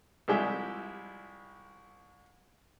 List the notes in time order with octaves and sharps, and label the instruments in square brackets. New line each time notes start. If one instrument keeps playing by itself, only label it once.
[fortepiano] C2 F3 G3 G#3 G4 E5